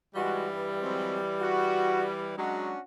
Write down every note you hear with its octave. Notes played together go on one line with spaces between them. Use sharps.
G#2 E3 G3 G#3 F#4
G2
F#3 G#3 C4
F#4
F#3 G#3 C#4 D4 F#4